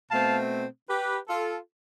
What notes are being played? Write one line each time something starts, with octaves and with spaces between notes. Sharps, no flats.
B2 A3 C4 F5 A5
G4 B4
F4 A4